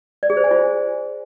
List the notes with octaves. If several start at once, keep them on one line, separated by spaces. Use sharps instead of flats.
D5
G#4
C5
G#5
F4